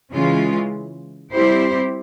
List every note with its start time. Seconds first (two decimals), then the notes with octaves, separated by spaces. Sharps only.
0.12 C#3 E3 G#3 C#4 F4
1.32 G3 C4 E4 G4 C5